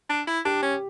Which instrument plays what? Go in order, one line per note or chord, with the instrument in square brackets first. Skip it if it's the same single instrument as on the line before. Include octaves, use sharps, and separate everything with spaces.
[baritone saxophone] D4
E4
[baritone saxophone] D4 [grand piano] G4
[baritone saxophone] C#4